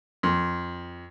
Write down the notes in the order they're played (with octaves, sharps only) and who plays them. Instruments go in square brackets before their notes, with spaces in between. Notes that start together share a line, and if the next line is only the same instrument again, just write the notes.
[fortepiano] F2